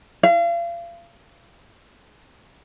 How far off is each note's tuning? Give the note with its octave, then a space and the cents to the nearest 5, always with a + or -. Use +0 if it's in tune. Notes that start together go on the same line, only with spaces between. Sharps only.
F5 -35